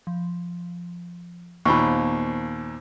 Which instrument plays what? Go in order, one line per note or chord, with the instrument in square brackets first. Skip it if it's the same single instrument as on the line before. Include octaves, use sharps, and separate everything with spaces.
[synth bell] F3
[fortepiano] D#2 A#2 [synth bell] B3 C5 [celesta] B5 C#6